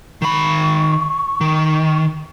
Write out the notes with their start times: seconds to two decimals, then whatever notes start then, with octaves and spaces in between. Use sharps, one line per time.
0.22 D#3 B5 C#6
1.41 D#3